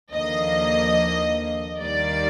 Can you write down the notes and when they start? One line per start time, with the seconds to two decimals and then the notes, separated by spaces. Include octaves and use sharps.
0.14 D#2 D3 F3 A#3 D#5
1.80 D#2 D#3 G3 A#3 D5